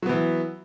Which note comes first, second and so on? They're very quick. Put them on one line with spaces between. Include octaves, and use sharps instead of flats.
F#3 B3 E3